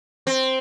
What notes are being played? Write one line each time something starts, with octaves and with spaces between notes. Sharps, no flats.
C4